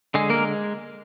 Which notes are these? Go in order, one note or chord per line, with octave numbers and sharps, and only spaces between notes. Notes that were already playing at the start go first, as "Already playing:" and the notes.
D3 G#3 G#4
G#3 A#3 A#4